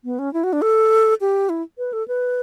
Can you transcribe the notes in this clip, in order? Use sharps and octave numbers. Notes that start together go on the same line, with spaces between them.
B3
C#4
E4
F#4
D4
A4
G4
E4
B4
A4
B4